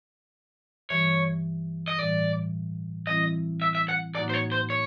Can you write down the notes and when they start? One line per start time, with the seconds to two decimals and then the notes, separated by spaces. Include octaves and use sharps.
0.90 G2 E3 G3 C#5
1.88 D#5
1.98 A2 E3 G3 D5
3.07 E3 G3 C4 E4 D#5
3.62 E5
3.75 E5
3.89 F#5
4.15 A2 F#3 A#3 D#4 F#4 D5
4.30 C5
4.34 C#5
4.52 C5
4.70 C#5